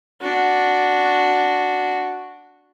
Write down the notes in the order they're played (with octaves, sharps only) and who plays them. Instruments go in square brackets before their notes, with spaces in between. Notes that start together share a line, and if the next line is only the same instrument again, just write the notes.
[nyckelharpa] D4 F#4